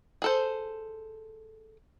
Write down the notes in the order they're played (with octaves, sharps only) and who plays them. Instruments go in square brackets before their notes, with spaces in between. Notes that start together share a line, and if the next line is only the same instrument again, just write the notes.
[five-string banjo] G#4 A4 C5